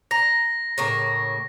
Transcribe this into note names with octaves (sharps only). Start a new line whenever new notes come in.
A#5 A#6
A2 C#3 A#3